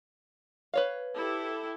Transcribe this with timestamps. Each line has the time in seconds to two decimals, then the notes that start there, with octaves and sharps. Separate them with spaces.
0.74 B4 C#5 F5
1.14 E4 G4 A4